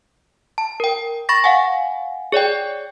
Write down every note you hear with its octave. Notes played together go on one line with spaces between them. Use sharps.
A5
A#4 G5
B5 C#6 A6 A#6
F5 F#5 G#5
G#4 C#5 D5 G5